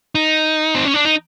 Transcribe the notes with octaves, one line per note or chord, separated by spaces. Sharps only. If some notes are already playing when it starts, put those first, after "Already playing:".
D#4
C4
C#4
D4
D#4